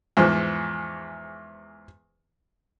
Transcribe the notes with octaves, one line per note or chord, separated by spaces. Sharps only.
E2 G#2 F3